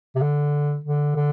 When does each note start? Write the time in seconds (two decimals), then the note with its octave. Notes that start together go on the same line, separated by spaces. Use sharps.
0.16 C3
0.21 D3
0.84 D3
1.16 D3